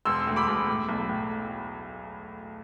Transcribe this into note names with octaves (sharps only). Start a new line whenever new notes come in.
E1 C6 E6
D2
B5 D6
E1
A2
B1
A2